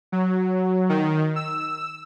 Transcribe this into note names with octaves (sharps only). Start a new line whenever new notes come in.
F#3
D#3
E6